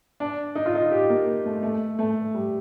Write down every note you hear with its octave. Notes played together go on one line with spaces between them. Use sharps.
D4
D#4
F4
D#4
G4
A#3
A3
A3
A3
G3